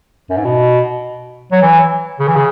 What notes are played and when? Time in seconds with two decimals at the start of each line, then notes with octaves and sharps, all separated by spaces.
0.30 F#2
0.37 G#2
0.45 B2
1.52 F#3
1.62 E3
2.20 C#3
2.28 E3
2.36 C#3